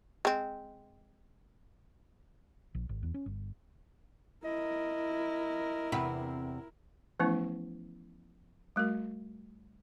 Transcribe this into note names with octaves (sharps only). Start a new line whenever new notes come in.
G#3 C4
A#1
G#1
E2
C#4
G1
E4 A#4 D#5
E2 C3 C4 B4
E3 F3 A3 B3 C#4 E4
G3 A3 F#4 A#4